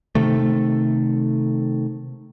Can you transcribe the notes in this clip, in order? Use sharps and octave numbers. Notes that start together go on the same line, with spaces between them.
C3 D#3 A3